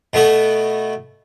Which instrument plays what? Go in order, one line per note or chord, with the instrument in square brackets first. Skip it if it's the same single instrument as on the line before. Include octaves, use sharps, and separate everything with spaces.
[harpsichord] B2 A3 B3 A4